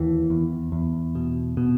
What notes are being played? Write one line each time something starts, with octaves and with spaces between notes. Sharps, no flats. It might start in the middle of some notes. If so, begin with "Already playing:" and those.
Already playing: D#2 E3
E2
E2
B2
B2